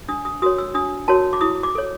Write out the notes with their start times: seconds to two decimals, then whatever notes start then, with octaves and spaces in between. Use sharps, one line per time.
0.08 D4 D#6
0.25 D#6
0.42 F#4 A#4 C#5 D#6
0.58 E6
0.74 D4 D#6
1.08 F#4 A#4 C#5 A5
1.33 D6
1.41 E4 D#6
1.63 D6
1.75 A4 C#5